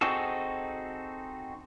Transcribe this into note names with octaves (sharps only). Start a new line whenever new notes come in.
C4 D#4 F#4 G#4 A4